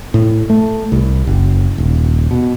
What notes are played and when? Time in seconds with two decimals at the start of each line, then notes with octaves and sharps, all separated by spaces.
0.14 A2
0.50 A3
0.92 C2
1.27 F#1
1.78 D#1
2.31 B2